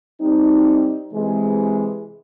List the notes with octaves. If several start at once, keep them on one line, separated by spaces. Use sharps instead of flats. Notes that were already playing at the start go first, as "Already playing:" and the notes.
G3 C4 D#4
C3 E3 G#3